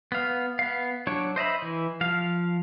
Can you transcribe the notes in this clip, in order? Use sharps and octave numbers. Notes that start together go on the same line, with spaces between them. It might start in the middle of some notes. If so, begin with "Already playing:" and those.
B3 F5
B3 F5
F#3 D4 C#5
C5 D#5 E5 B5
E3
F3 F5